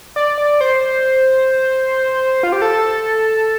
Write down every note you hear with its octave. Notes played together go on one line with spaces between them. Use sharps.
D5
D5
C5
F4
G4
A4